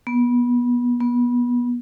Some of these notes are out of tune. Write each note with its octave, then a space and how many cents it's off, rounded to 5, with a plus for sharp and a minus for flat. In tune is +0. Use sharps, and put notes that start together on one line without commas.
B3 -25
B3 -25